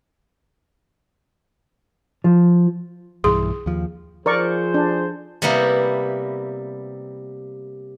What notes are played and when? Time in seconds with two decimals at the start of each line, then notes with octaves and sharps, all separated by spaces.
2.24 F3
3.24 B1 G2 E3 G#4 C6
3.66 D#2 F3
4.26 F3 G#4 A#4 C5 D5 C#6
4.74 D4
5.42 C3 G3 A#3 B3 E4